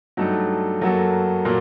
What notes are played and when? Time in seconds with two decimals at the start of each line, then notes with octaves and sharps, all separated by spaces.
0.17 G2 F#3 A3 D#4 A4
0.81 F#2 F#3 A#3 F#4 A4
1.45 A#2 F#3 A#3